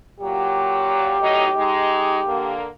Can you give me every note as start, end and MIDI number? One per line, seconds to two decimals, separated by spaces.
0.20 1.14 46
0.20 1.14 54
0.20 2.54 67
1.19 1.48 45
1.19 1.48 54
1.19 1.48 63
1.56 2.19 56
1.56 2.19 63
2.25 2.68 50
2.25 2.68 58